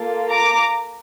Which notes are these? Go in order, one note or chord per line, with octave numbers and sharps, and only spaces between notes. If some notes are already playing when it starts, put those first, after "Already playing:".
Already playing: A#3 F4 A4
A#5 D6